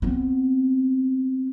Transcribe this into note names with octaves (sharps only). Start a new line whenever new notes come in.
B3 C4